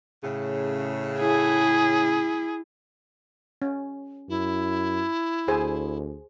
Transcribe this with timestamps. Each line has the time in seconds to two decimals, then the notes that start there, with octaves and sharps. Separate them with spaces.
0.23 A2 C#3
1.20 E4 G#4
3.62 C#4
4.29 F#2 E4
5.48 D2 G#4 C5 G#5